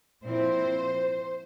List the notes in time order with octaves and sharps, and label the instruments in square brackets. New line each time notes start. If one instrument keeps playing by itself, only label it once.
[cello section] A#2 F3 C4 E4 C5